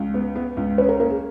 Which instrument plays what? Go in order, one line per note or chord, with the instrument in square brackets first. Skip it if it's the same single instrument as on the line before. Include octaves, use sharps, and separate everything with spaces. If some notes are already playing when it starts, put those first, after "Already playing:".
Already playing: [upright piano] C#2
B3
B3
C#2
[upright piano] C#4 [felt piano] B4
[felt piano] A#4
[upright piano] A#3 [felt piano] A#4
[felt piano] G#4